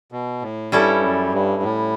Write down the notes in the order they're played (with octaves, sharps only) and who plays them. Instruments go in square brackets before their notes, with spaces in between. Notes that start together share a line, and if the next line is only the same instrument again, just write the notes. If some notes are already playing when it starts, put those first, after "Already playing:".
[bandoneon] B2
A2
[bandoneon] G2 [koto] G3 C#4 E4 A4
[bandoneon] F#2
G2
A2